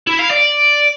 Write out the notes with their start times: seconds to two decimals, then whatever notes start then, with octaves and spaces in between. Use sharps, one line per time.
0.07 E4
0.19 F5
0.30 D5